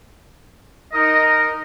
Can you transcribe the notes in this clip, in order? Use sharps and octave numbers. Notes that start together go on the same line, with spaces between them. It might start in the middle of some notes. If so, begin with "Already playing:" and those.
D#4 A#4 D#5